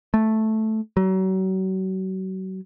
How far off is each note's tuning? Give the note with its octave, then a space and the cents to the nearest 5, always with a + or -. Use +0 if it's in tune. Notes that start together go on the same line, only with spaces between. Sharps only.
A3 -5
F#3 +35